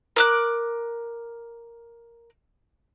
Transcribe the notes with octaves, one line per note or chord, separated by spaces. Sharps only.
A#4 D6 F#6